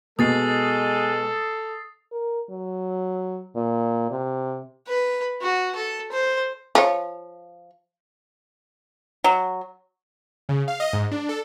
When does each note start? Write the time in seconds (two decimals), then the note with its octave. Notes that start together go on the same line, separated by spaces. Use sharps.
0.19 B2 G#3 A4 D#6 A6 C7
2.12 A#4
2.50 F#3
3.56 A#2
4.11 C3
4.88 B4
5.42 F#4
5.75 A4
6.12 C5
6.75 F3 C#5
9.24 F#3
10.49 C#3
10.68 F5
10.80 D#5
10.93 G#2
11.12 D4
11.29 A4